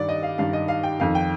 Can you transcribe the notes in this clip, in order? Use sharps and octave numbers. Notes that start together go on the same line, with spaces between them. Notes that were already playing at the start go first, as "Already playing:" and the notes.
Already playing: G2 D#3 D5
D#5
F5
G2 D#3 F5
D#5
F5
G5
F2 D#3 F5
G5